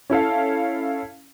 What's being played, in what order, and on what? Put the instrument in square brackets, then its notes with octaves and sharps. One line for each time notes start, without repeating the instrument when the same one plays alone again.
[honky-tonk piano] C#4 E4 A4 F5